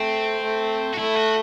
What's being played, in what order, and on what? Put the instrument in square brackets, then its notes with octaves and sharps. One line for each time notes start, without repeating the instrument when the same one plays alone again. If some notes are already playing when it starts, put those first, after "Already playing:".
Already playing: [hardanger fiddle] A3 [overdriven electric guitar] C4
[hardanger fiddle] A3
[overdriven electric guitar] F#4
[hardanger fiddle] A3 [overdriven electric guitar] E4
[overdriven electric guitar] F#4